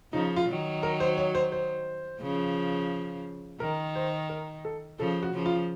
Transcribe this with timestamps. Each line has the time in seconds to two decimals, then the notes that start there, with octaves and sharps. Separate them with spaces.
0.13 C#3 F3 D#4
0.36 F4
0.48 D#3 F#3
0.83 A#4
1.00 C5
1.18 C#5
1.35 C5
1.52 C5
2.21 C#3 F3
3.60 D#3 A#4
3.95 C5
4.29 A#4
4.65 A4
4.99 C#3 F3 A4
5.23 F#4
5.34 C#3 F3
5.46 F4